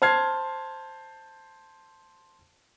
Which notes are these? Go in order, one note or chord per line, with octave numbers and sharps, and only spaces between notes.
C5 A5 F6 G#6 C7